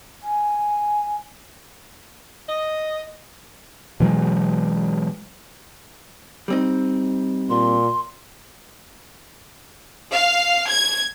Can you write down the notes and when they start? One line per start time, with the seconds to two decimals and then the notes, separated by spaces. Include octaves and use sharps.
0.22 G#5
2.49 D#5
4.00 B2 E3 F#3 G#3
6.48 G3 C4 D#4
7.50 A#2 C6
10.13 F5
10.68 G#6